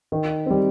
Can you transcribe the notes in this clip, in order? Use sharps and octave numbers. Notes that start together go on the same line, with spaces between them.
D#3
G3 C4